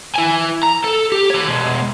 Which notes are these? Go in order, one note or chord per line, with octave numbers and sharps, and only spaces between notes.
E4 G#5
A#5
A4
G4
G4 C#5
B2 G#3